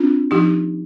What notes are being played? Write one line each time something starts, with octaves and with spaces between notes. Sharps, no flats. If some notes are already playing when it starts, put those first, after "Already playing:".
Already playing: C4 D4 F4
F3 D#4 G4